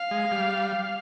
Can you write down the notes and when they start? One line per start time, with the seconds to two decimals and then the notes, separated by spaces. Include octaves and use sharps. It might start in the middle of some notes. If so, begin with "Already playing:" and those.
Already playing: F5
0.11 G#3
0.31 G3